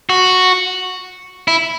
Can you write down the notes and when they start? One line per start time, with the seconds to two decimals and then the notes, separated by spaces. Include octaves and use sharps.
0.09 F#4
1.48 E4